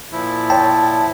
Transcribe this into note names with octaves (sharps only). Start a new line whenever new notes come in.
A#2 F3 E4
C#5 G5 A5